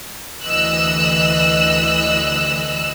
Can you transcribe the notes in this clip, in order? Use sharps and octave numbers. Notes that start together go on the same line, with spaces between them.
D2 E3 D#5 E6 F#6